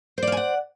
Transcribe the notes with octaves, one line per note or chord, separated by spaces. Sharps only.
C5 D5 F5 F#5 G#5